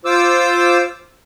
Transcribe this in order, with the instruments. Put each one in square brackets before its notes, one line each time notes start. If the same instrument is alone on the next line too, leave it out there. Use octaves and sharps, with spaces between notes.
[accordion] F4 C5 D6 E6